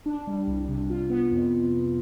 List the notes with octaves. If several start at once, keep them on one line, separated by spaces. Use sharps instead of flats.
D4
G3
C2
C3
F4
B3
F2